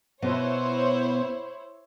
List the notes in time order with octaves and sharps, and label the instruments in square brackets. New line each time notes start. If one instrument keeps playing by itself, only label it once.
[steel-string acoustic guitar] B2 B3 D#5 [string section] E4 C5 C#5